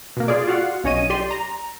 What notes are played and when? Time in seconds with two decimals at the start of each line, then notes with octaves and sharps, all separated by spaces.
0.17 B2 A#3
0.28 F4 G#4 D5
0.47 F4 F#4 F5 F#5
0.84 B1 C#4 C#5 D#5 D#7
1.10 G4 D5 C6
1.31 A#5